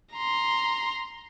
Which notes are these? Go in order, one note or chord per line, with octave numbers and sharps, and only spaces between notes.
A#5 C6